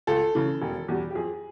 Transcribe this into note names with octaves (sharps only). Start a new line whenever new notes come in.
C#2 A4
C#3 E3
E1
E2 B2 G3
G4
F2 G#4